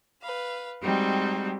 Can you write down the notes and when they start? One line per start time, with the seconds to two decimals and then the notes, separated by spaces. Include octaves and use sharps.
0.22 B4 F5
0.82 G3 G#3 C4 D#4 F#4